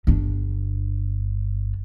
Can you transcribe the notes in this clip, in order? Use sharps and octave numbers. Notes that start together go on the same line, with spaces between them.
G1 D4